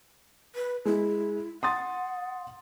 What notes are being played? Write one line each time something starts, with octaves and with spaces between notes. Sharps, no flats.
B4
G#3 E4
F#5 C6 D#6 A6